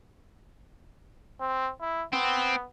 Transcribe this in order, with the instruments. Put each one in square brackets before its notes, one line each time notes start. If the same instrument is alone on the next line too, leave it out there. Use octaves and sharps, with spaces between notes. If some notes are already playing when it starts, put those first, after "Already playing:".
[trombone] C4
E4
[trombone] B3 [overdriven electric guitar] C4